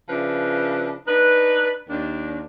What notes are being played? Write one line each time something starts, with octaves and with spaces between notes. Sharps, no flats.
C#3 F3 D4 E4 B4
D4 D#4 B4
D#2 D4